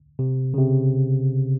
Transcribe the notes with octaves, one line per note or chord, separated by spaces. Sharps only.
C3
C#3
C3